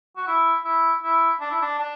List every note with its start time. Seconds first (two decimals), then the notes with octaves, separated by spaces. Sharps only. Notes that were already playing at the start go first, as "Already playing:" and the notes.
0.17 F#4
0.27 E4
0.64 E4
1.03 E4
1.40 D4
1.51 E4
1.61 D4
1.79 D4